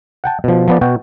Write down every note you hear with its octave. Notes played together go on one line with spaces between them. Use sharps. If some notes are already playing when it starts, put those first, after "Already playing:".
F#5 G5 A5
B2 F3
F3 B3 D5
B2 F#4 G5